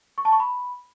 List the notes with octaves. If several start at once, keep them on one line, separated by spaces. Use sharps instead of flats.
C#6
A5
C#6
B5